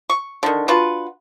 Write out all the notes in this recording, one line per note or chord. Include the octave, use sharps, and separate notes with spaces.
C#6
D3 D#3
D4 F4 F#4 B4